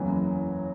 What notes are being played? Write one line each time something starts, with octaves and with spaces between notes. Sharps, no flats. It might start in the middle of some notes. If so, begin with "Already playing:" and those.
Already playing: F#1 E2 C#3 E3 F#3